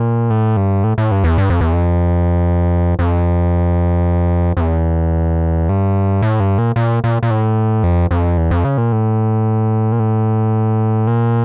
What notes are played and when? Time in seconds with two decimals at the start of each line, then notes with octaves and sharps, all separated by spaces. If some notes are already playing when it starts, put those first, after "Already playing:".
Already playing: A#2
0.30 A2
0.57 G2
0.84 A2
0.98 A2
1.12 G2
1.24 E2
1.38 G2
1.50 F2
1.61 E2
1.73 F2
2.99 F2
4.57 F2
4.61 E2
5.69 G2
6.22 A2
6.40 G2
6.58 A#2
6.76 A#2
7.04 A#2
7.23 A#2
7.31 A2
7.83 F2
8.11 F2
8.38 E2
8.51 F2
8.64 C#3
8.78 A#2
8.92 A2
9.92 A#2
10.00 A2
11.07 A#2